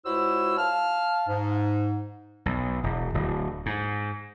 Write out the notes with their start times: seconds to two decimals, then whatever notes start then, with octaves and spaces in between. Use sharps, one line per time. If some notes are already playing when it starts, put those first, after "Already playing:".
0.05 C#2 E4 F#4 C5 C#5 E6
0.58 F5 A5 F6
1.28 G#2
2.46 B1
2.83 E1
3.14 D1
3.66 G#2